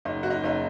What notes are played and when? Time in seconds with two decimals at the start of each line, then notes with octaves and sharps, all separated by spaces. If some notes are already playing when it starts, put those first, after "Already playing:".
0.05 F#1 D#4
0.23 F#4
0.30 D#4
0.44 F#1 D#4